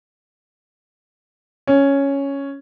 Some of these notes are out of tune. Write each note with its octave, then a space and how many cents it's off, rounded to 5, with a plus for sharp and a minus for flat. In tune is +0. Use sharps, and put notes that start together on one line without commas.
C#4 +0